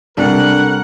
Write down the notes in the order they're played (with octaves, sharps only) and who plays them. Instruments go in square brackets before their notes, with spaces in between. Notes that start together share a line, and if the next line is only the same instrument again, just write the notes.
[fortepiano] C2 [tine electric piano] D4 [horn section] A4 A#4 [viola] F#5